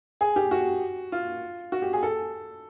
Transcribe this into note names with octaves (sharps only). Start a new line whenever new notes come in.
G#4
G4
F#4
F4
F#4
G4
G#4
A4